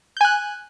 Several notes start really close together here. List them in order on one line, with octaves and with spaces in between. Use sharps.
G6 G#5 F#6